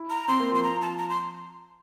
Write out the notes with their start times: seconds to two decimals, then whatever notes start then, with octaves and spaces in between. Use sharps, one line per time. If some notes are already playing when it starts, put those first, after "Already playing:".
Already playing: E4
0.10 A#5
0.28 C4 C6
0.40 A#3
0.52 F3 C6
0.63 A#5
0.81 A5
0.98 A#5
1.10 C6